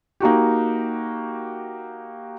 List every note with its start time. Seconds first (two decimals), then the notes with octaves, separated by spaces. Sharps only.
0.20 A#3 D#4 F#4 G4